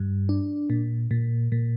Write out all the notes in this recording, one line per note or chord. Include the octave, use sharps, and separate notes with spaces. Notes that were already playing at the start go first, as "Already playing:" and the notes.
Already playing: G2
D4
A#2
A#2
A#2